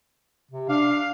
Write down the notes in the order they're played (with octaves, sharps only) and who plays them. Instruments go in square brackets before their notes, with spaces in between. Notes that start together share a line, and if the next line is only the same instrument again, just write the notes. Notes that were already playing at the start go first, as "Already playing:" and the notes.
[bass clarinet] C3
[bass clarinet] D4 [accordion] F5